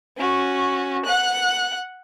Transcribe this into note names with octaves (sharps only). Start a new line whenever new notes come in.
C#4 F#4
F#5 F#6